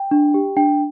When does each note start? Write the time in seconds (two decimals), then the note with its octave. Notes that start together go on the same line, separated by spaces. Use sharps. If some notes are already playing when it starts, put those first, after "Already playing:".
Already playing: G5
0.11 D4
0.34 G4
0.56 D4 G5